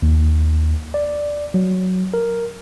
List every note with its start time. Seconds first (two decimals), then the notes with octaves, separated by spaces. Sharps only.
0.02 D#2
0.94 D5
1.54 F#3
2.14 A#4